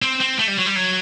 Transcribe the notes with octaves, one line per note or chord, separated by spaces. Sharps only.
C4
C4
A3
G3
F#3
G3
F#3